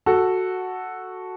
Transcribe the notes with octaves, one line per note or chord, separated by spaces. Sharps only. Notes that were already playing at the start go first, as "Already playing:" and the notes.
F#4 A4